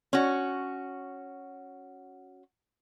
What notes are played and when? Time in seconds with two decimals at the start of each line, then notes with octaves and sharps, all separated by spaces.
0.13 C#4 F#4